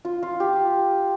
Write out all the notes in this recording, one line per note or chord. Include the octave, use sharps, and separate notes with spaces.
F4
F4
G4